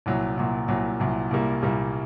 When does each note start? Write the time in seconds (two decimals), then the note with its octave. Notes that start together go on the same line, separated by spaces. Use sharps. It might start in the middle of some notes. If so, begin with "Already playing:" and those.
0.06 C2 A#2 F#3
0.37 C2 A#2 F#3
0.68 C2 A#2 F#3
1.00 C2 A#2 F#3
1.31 C2 A#2 G3 A#3
1.62 C2 A#2 G3 A#3